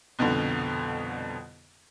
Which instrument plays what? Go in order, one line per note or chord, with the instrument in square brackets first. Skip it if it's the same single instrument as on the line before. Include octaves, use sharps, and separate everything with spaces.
[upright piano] C2 F2 B2 D3